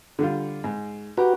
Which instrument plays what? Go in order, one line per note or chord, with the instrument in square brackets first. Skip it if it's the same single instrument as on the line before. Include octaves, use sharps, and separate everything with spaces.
[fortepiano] D3 G3 F4
G#2
[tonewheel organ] F#4 B4 [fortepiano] G4 A#5